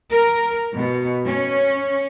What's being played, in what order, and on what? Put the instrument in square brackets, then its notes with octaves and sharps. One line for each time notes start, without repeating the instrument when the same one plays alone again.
[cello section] A#4
B2
C#4